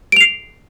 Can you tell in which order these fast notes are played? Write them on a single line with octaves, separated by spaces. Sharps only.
D7 F7 C7